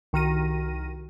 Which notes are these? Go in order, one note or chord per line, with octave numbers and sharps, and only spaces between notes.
C2 D#3 F#4 F6 A#6 D#7